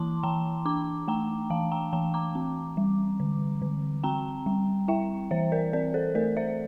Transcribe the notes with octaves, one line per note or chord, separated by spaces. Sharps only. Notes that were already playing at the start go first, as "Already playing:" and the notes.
Already playing: E3 A#3 E4 A5 C6 D6
E3 G5 A#5
D4 A#5 D6
A3 G5 A#5
E3 F5 A5
G5 A#5
E3 G5 A#5
A#5 D6
C4
G3
D3
D3
C4 G5 A#5
G3
E4 E5 G5
E3 C5 E5
A#4 D5
C4 A#4 D5
A4 C5
A3 A#4 D5
C5 E5